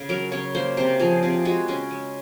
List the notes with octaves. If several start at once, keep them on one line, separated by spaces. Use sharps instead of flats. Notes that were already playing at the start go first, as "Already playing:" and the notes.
Already playing: C#3
F#3 A#4
C#3 C#5
A#3 C5
C3 C5
F3 G#4
C3 G#4
G#3 F#4
C#3 C#4
G#3